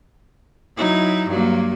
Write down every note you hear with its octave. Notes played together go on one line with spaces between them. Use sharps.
F#3 D#4 E4
G2 F#3 A#3